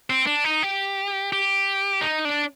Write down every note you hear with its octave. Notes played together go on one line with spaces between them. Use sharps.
C4
D4
D#4
G4
G4
D#4
D4